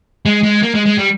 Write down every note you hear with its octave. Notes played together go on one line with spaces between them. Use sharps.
G#3
G#3
A#3
G#3
G#3
G3